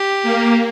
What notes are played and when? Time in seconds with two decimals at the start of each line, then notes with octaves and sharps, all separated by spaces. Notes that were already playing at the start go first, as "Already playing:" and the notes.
Already playing: G4
0.23 A#3